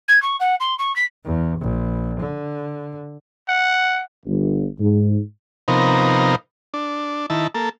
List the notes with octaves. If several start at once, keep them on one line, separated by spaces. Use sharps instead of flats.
G#6
C#6
F#5
C6
C#6
B6
E2
A#1
D3
F#5
G1
G#2
C3 F3 B3 D#4 A#4
D4
D#3 E4 A5
A#3 A4